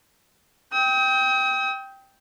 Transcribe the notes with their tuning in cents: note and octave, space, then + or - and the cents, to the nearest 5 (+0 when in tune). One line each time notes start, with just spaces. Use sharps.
G5 +0 D#6 +40